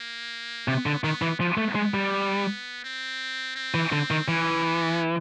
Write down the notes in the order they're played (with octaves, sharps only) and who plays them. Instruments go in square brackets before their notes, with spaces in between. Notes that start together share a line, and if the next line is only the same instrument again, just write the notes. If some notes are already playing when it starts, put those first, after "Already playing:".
Already playing: [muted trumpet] A#3
[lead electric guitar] C3 [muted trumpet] B3
[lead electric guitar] D3
[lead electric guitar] D#3 [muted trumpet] B3
[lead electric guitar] E3
[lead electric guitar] F3 [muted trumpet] B3
[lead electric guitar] A3
G#3
G3
[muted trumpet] C4
C4
[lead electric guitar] E3
D3
D#3
[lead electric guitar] E3 [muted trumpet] C#4
[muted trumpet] B3